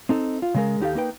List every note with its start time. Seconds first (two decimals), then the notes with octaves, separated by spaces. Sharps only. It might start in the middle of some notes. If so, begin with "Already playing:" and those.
0.09 C4 D#4 A4
0.42 F4
0.54 C#3 G#3 A#4
0.80 D#2 D#4 G4 A4 F5
0.95 A#3 D#4 B4 G5